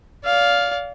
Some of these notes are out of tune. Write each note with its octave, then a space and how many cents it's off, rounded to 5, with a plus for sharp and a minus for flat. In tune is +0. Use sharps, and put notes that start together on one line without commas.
D5 -35 F5 +5